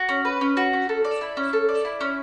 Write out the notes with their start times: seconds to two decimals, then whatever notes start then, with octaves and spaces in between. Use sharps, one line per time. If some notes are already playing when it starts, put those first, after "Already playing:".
Already playing: F#4
0.09 C#4
0.25 B4
0.41 C#4
0.57 F#4
0.73 C#4
0.89 A4
1.04 D5
1.21 E4
1.37 C#4
1.53 A4
1.69 D5
1.85 E4
2.01 C#4